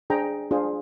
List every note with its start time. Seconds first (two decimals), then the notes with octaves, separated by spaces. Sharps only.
0.10 D4 G#4 C5 G5 A#5
0.51 D4 F4 G#4 C5